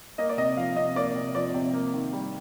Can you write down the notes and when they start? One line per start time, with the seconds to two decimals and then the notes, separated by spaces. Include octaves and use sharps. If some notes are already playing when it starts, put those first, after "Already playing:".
0.18 A#3 D#5
0.29 D5
0.37 C3 D#5
0.57 F3 F5
0.76 C3 D#5
0.96 A#3 D5
1.15 C3
1.34 F3 D5
1.54 C3
1.73 A#3
1.93 D#3
2.13 G3